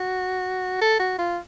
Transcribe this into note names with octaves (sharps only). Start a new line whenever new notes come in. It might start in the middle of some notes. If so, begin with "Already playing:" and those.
Already playing: F#4
A4
F#4
F4